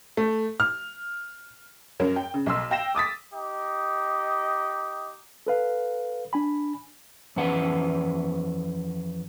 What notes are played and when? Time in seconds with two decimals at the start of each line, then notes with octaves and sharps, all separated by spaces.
0.17 A3
0.60 F6
2.00 F#2 F#3 C#4 A#4
2.16 G5
2.34 C#3
2.46 B1 C6 E6
2.70 F5 G5 A#6 E7
2.95 D6 D#6 A6 B6
3.34 D#4 G4 D#5
5.47 A4 B4 F5
6.33 D4 G#5 B5
7.36 F2 E3 C#4 B4 F#5